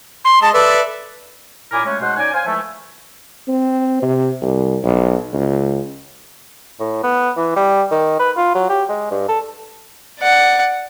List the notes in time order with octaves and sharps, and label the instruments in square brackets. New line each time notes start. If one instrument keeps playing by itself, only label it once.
[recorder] C6
[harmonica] G#3 D#5 [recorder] A5
[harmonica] A4 D5 E5 [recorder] B4
[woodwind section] F#2 A#2 E4 A#4 D5 G#5
F#3 G#3 A3 C#4
G#2 B2 G#3 C5 F#5
C#4 D#4 D5 G#5
C5 F5 G#5
E3 F3 G#3 A3
[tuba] C4
C3
C2
B1
C#2
[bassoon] A2
B3
E3
G3
D#3
B4
F4
F#3
G4
G#3
G2
A4
[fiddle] D5 F#5